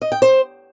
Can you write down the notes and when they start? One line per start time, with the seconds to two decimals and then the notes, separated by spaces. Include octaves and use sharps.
0.02 D#5
0.12 G5
0.22 C5